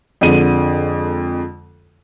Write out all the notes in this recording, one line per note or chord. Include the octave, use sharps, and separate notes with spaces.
F2 D3 G#3 D#7